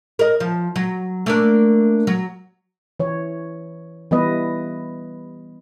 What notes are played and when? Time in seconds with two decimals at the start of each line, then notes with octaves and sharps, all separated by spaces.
0.19 A#4 D#5
0.40 F3
0.76 F#3
1.26 A3 A#3 D4
2.07 F#3
3.00 E3 C#5
4.11 E3 G3 B3 B4 D#5